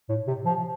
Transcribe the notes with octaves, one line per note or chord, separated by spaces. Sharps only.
A2
C3
F3